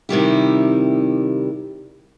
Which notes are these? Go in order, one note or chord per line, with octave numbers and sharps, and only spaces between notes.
C3 D#3 G3 E4